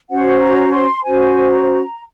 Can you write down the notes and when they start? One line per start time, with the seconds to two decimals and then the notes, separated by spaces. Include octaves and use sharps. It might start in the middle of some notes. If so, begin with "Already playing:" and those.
0.09 C#4 F#4 C5 F#5
0.41 A#5
0.73 C6
1.04 C#4 F#4 C5 G#5
1.51 A#5